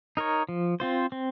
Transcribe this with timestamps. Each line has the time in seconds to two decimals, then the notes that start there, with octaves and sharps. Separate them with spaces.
0.17 D#4 A#4 C#5
0.49 F3
0.80 C4 F4 C5
1.12 C4